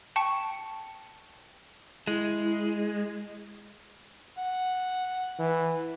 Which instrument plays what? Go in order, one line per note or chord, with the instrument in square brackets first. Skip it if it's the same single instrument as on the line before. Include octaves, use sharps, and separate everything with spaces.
[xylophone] G5 A5 C#6 C#7
[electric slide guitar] G#3 [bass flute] E4
[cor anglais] F#5
[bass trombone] E3